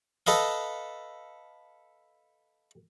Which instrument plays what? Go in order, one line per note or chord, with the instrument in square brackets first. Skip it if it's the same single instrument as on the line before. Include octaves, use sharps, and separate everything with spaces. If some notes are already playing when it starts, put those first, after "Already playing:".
[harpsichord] A4 B4 D#5 F5